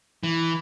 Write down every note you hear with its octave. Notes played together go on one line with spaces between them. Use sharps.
E3